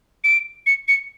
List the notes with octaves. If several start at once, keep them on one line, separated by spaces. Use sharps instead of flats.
D7
C#7
C#7